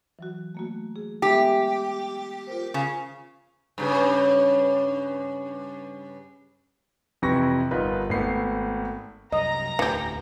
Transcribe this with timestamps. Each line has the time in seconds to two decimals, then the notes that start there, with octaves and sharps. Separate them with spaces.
0.19 E3 F#3 F#4
0.55 A3 A#3 F#4
0.96 G#4
1.22 G#3 B3 G4 E5
2.47 F4 A#4 C5
2.74 C#3 F5 G#5
3.78 G2 C#3
7.22 F2 C3 E3 B4 C#6 A#6
7.71 G1 D#4 F4 A#4 B4
8.09 G#1 A3 B3 C7
9.32 C2 F#2 D#5 A#5
9.79 E1 D2 A2 E3 G4